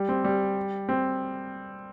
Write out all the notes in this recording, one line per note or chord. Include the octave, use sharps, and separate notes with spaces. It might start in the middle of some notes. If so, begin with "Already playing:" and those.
Already playing: G3
C4
G3
C4